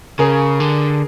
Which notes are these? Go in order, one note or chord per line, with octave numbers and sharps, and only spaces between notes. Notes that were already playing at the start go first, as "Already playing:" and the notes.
C#3 G#4 A#4
D3